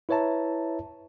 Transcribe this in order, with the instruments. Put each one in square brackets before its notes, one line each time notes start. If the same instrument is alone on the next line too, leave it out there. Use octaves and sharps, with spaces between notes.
[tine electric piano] E4 B4 C#5 E5 A5 A#5